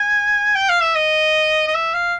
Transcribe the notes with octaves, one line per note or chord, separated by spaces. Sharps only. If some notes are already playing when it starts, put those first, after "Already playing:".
Already playing: G#5
G5
F5
E5
D#5
D#5
E5
F5